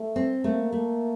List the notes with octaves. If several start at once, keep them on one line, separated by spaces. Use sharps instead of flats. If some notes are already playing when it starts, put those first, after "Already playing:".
Already playing: A3
C4
A3 A#3
A3